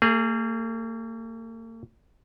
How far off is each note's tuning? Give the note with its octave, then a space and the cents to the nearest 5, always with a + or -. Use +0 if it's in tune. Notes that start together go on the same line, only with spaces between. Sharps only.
A#3 -45 G#4 +0